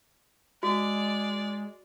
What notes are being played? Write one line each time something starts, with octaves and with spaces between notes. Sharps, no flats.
G#3 F#4 D5